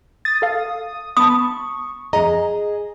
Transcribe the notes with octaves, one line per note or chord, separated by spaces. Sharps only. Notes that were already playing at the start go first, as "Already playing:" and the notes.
D#6 A6
A4 F5
B3 A5 B5 D#6
C#6
F2 G#4 D#5 A#5